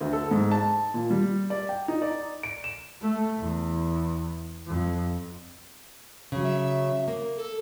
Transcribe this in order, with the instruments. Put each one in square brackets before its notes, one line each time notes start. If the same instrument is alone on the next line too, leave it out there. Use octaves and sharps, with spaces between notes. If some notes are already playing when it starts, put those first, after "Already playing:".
[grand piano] D2
A4
G#2
A5
A#2
G3
D5
G5
D#4
D5
D7
E7
[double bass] A3
E2
F2
[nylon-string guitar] C#3 F#3
[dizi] E5
[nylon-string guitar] A#3
[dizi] A4